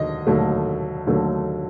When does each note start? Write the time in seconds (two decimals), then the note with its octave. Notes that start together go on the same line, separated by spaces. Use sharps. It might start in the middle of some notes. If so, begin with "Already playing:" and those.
Already playing: D#2 D3 F#3 D#5
0.27 D#2 D3 F#3 A3
1.07 D#2 D3 F#3 A3